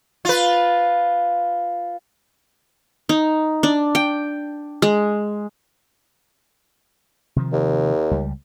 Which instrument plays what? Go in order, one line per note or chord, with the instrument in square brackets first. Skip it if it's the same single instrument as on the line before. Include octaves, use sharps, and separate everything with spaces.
[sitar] F4 B4
[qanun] D#4
D4
G5
G#3
[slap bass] C3 D#3 F3
[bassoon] D#2
[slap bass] C#2 G3